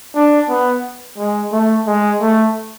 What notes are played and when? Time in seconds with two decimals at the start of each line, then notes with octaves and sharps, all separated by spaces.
0.16 D4
0.49 B3
1.18 G#3
1.52 A3
1.87 G#3
2.22 A3